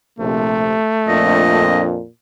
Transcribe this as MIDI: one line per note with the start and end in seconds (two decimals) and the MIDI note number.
0.19 0.75 34
0.19 0.75 48
0.19 1.73 57
1.08 2.00 41
1.08 2.08 46
1.08 2.00 62
1.08 1.84 75